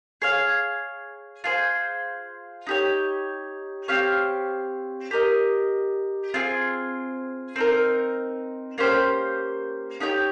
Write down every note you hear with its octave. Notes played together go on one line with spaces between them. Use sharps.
G#4 C#5 F5
F4 G#4 C5
D#4 G4 C#5
C4 G4 C#5 F5
G4 A#4 D#5
C4 F4 G#4
C4 D#4 A#4
A#3 C#4 G4 C5
D#4 G4 C#5 G5